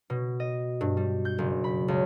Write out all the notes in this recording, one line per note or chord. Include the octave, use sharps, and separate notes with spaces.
B2
D#5
G2
G3
G6
F#1
B5
C#2